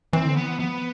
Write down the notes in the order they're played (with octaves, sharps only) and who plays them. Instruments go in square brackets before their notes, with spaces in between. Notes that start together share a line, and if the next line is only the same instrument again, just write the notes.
[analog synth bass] E3 [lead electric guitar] C4
[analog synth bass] D3
[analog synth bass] E3 [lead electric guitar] B3
[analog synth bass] F3 [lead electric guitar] B3